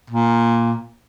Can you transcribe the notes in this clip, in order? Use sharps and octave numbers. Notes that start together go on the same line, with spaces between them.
A#2